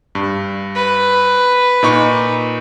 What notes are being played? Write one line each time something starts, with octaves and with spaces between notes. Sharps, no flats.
G2
B4
A#2 D#4 C#6